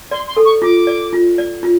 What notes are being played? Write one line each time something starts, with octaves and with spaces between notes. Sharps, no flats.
D5 C6
C6
A4
C#6
F4 D6
D5
F4
D5
F4